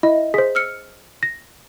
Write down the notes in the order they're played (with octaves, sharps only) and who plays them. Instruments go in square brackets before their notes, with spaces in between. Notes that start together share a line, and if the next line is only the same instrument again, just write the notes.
[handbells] E4 [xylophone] D#5 E5
[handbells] G#4 C5 [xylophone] B6
[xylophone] E6 F6 C#7
[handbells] A#6